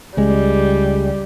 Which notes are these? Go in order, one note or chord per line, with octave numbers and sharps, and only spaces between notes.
C#2 G3 G#3